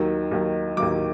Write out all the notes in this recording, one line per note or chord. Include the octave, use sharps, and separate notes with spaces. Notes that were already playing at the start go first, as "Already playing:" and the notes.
Already playing: D#2 D#3 F#3
D#2 D#3 F#3
D#2 D#3 F#3 D6